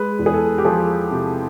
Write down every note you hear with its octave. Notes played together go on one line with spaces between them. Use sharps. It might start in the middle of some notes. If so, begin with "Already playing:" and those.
Already playing: G#3 B4
E2
G#4
A4
G4
F3 G#4
C3